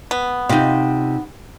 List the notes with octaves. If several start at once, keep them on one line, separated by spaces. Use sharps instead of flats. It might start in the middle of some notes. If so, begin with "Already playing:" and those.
B3
C3 D#4 F4